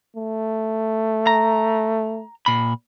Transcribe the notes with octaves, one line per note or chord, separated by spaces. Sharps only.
A3
A#5
A#2 B5